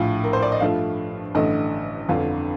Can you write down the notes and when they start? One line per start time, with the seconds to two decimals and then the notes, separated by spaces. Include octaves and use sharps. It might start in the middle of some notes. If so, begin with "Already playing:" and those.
Already playing: A#1 A2 F3 F5
0.24 A#4
0.33 C5
0.42 D5
0.52 D#5
0.60 G2 F3 A3 F5
1.34 A1 G2 D3 A3 D#5
2.09 G1 F2 D3 F5